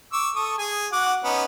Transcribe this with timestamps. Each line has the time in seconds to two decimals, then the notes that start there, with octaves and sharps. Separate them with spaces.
0.13 C#6 D6 E6
0.35 A4 C#6 D#6
0.58 G#4 G#5
0.92 F#4 F#5 D6
1.24 B3 C#4 D#4